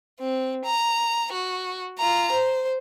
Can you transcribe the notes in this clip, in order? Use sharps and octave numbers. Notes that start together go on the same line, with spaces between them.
C4
A#5
F#4
F4 A#5
C5